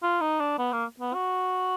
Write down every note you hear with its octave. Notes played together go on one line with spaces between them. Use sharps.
F4
D#4
D4
B3
A#3
B3
F#4